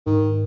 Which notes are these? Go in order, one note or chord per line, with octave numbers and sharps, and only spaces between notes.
G#2 D#3